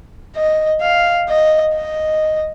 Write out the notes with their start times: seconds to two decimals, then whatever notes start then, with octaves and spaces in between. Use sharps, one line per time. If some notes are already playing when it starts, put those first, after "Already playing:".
0.36 D#5
0.82 F5
1.28 D#5
1.74 D#5